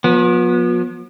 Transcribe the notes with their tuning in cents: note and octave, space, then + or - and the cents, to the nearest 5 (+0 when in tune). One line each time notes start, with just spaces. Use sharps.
F3 +40 B3 -30